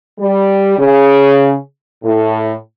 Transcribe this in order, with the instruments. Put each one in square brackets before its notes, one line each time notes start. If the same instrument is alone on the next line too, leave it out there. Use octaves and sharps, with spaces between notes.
[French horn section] G3
C#3
A2